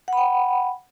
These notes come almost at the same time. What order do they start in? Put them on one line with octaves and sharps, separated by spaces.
F#5 B5 G5